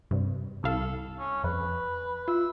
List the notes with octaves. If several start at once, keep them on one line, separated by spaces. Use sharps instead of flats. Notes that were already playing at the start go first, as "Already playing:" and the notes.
G2 C3
C2 A4 F5
C#4
F2 B4
F4 E5